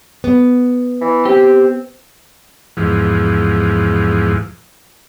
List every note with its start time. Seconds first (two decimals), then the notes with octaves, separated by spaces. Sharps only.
0.24 B3
1.01 E3
1.25 C4 G4
2.77 E2 G#2 F3